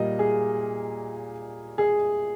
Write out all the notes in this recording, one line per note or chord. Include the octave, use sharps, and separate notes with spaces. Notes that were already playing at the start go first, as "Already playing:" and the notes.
Already playing: A#2 G3 A#3 D#5
G#4
G#4